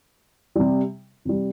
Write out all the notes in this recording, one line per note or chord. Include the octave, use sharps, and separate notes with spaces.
C3 G3
C3 G3